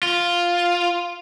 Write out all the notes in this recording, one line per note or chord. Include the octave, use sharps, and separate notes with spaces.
F4